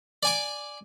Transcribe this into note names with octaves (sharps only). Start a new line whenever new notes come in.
D5 G#5 D6